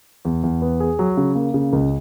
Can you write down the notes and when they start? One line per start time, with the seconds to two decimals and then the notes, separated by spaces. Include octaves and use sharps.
0.25 E2
0.43 E2
0.62 B3
0.80 G#4
0.99 F#3
1.17 C#3
1.35 A#3
1.54 C#3
1.73 C#2